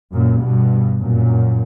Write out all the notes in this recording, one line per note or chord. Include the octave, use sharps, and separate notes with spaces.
F#2 A#2
G2 B2
F#2 A#2